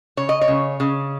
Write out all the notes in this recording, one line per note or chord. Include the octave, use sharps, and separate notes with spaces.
C#3 C#5
D#5
C#5
C#3
C#3